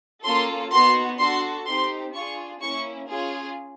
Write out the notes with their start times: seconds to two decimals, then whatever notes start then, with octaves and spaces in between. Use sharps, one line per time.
0.24 A#3 C#4 F4 A4 C6
0.71 B3 D#4 F#4 C6
1.19 D4 F#4 A4 C6
1.66 C4 D#4 G4 C6
2.14 D4 F4 G#4 C#6
2.61 A#3 C#4 E4 C#6
3.09 C#4 F4 G#4